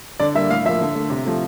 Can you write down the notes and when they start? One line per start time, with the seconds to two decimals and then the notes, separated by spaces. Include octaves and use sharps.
0.20 D3 D5
0.34 G3 A#3 E5
0.50 A2 F5
0.65 F3 A#3 E5
0.81 D3
0.95 A3
1.10 C3
1.26 F3 A3